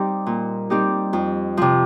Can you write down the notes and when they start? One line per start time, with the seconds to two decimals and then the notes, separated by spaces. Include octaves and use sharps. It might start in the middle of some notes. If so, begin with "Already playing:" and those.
Already playing: G3 C4 D#4 G4
0.26 A#2
0.70 G3 C4 D#4 G4
1.13 F2
1.57 C3 F3